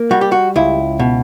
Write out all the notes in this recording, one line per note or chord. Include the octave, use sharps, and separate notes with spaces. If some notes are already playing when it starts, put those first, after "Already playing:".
Already playing: A#3
G3 F#4
G4
F#4
C#2 E4
B2